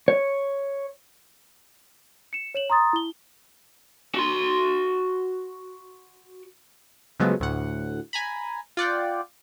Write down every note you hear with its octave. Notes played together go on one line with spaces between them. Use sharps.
C#5
C#7 E7
C#5 E7 F#7
A#5 C6 D#6 A6
E4 G7
F#4 C6
C#3 F3 F#3 G#3 A3 B3
D2 A2 F#5
G#5 A#5 B5
F4 D5 F#5 G5